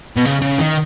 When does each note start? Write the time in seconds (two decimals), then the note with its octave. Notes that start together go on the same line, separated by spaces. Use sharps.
0.16 B2
0.25 C#3
0.41 C#3
0.59 D#3